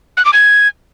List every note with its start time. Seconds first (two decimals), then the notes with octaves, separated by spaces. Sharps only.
0.17 F#6
0.25 D6
0.33 G#6